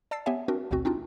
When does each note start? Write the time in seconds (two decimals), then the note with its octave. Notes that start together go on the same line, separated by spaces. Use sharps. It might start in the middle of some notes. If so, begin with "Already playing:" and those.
0.11 D5 A5 E6 A6 C7
0.26 B3 G4 C#5 E5 G#5
0.48 C4 D4 F#4 A#4
0.71 A1 D2 B2 C4 F#4
0.85 C4 D4 D#4 F4